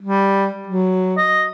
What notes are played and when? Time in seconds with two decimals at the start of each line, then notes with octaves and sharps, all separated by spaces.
0.02 G3
0.68 F#3
1.17 D#5